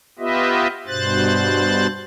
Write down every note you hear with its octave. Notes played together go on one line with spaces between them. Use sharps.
B3 F4 G4 B4 D#5 E5
G2 B2 C5 F#6 A6